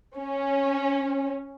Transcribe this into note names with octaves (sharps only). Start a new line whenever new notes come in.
C#4